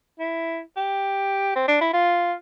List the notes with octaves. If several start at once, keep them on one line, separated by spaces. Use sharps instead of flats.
E4
G4
C4
D4
E4
F4